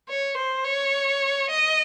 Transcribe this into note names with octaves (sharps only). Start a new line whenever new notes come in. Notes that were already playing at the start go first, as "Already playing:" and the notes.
C#5
C5
C#5
D#5